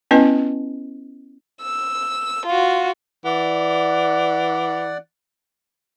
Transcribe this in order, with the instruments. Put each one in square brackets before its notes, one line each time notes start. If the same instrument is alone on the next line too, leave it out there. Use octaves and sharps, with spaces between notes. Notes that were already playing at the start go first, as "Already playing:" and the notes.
[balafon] B3 C#4 E4 B4 D#5 G#5
[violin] E6
F4 F#4
[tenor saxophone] E3 [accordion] D5 F#5